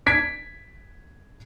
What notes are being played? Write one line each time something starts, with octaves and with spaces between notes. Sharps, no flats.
G#6 B6 D7